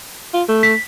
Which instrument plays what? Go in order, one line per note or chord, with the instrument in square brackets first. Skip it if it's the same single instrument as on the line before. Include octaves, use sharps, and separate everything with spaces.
[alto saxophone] F4
A3
[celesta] B6